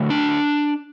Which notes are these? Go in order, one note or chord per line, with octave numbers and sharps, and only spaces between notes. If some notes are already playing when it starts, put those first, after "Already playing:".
Already playing: D3 F#3 A3
D4